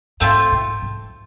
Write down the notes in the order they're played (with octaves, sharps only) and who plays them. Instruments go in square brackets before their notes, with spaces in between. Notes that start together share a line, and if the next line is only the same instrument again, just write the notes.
[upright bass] G#2 [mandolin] A3 C4 F4
[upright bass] G#2
G#2